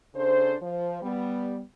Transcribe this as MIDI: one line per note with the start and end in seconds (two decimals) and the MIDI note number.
0.15 0.55 49
0.15 0.55 62
0.15 0.55 69
0.15 0.55 72
0.61 1.00 53
0.61 1.00 72
1.02 1.60 55
1.02 1.60 59